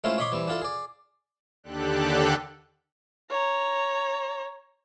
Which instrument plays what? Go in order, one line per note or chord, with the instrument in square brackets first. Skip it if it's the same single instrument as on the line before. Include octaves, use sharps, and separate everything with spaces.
[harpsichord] G#3 A3 C#4 E4 F4 C5
C#5 D#5 B5 C6 D6
E3 G3 C4
D4 E4 F4 A4
G#4 D5
[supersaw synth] D#2 D3 D4 G4 A4 F#6
[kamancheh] C#5 A#5